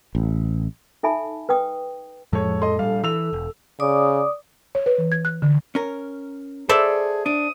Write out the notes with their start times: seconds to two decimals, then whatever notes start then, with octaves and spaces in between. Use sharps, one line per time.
0.15 A1
1.03 D#4 A4 E5 G#5 A5 B5
1.49 B4 G5 D#6
2.33 F2 A2 F3 G#3 A4 C#5
2.62 A4 D#5 C6
2.79 A#1 G3 F5
3.04 E3 E6 F7
3.33 E1
3.80 C#3 D5 D6 D#6
4.75 C#5
4.86 B4
4.98 E3
5.12 G#6
5.25 F#6
5.42 D3
5.75 C#4 A#4
6.69 G#4 A4 C5 D5 E5
7.26 D4 D#6